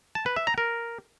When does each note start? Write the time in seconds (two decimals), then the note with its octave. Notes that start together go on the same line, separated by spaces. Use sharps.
0.15 A5
0.26 B4
0.36 E5
0.47 A#5
0.58 A#4